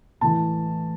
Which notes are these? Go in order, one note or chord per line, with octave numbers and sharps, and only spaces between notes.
A2 E3 A5